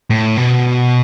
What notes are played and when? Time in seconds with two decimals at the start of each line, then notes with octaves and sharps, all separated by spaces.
0.10 A2
0.37 B2